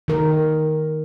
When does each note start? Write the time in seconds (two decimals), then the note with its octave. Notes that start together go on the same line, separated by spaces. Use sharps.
0.08 D#3 A#4